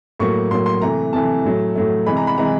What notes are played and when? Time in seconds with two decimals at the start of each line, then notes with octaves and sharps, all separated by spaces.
0.20 A2 F#3 A#3 C#6
0.51 A2 F#3 A#3 C6
0.66 C6
0.82 C3 E3 A3 A#5
1.13 C3 E3 A3 A5
1.45 A2 F#3 A3
1.75 A2 F#3 A3
2.06 C3 E3 G#3 B5
2.17 A#5
2.27 B5
2.38 C3 E3 G#3 A#5